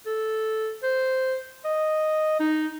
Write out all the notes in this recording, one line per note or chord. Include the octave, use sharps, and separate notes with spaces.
A4
C5
D#5
D#4